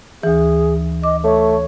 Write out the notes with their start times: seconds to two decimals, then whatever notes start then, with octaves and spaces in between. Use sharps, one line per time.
0.23 D2 E3 G#4
1.04 D#5 D6
1.24 A3 C#5